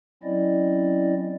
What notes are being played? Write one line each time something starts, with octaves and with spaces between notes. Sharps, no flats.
F#3 C4 C#4 E4 D5 D#5